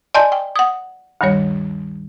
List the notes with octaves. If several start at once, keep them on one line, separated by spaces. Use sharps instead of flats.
D5 D#5 G#5 A5 C6 G6
G5
F#5 D#6
D2 G2 D#3 G3 C#5